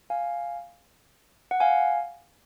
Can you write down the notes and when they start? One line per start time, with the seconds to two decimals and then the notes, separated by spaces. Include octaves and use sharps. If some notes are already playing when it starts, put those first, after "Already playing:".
0.10 F5 G#5
1.51 F#5
1.60 F5 G#5